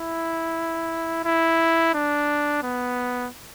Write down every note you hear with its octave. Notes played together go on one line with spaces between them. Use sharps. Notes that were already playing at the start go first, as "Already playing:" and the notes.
Already playing: E4
E4
D4
B3